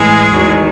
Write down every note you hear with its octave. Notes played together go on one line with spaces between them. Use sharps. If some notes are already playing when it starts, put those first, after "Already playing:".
Already playing: A2 E3 G#3 G#4
E2 D#3 F#3